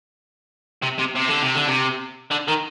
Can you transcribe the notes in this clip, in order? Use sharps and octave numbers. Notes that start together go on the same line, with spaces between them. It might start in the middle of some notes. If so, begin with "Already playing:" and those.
C3
C3
C3
D3
C3
D3
C3
D3
D#3